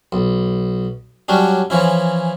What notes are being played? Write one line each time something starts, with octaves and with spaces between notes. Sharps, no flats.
B1
F#3 G3 C#4 D4
E3 F3 C#4 E4